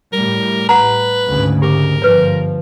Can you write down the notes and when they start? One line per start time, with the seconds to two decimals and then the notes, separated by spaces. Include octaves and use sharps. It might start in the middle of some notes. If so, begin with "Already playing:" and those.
0.13 A2 G3 A#4
0.69 B4 F#5 A#5
1.27 D2 G#2 C#3
1.62 G4 A#4 D6
2.02 G1 F3 B4 C#5